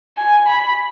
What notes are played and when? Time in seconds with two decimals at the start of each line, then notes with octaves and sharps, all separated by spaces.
0.18 G#5
0.47 B5